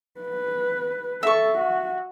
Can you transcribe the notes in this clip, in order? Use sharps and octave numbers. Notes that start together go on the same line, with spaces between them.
B4
A4 E5 C#6
F#4